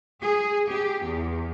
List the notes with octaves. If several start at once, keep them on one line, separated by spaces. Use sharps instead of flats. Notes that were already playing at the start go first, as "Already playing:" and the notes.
G#4
G4
E2